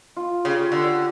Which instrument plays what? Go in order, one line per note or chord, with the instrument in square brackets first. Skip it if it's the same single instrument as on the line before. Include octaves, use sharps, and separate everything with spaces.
[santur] F4
[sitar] C#3 [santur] G4
[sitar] D3 [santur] A4